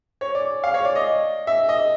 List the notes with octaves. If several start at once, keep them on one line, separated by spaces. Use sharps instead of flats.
C#5
D5
F5
C#5
D5
D#5
E5
D#5